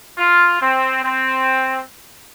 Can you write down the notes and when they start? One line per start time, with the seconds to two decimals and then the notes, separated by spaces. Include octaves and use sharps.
0.18 F4
0.61 C4
1.03 C4